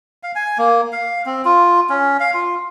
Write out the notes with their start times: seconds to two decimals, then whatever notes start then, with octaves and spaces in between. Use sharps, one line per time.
0.23 F5
0.35 G#5
0.58 A#3
0.92 F5
1.26 C4
1.45 F4
1.89 C#4
2.20 F5
2.34 F4